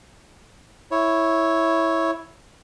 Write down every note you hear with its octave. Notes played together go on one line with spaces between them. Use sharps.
E4 C#5